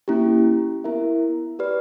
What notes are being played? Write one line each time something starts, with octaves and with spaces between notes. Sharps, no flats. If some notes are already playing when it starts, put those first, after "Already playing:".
A#3 C#4 E4 G4
B3 E4 A#4 E5
G4 B4 D5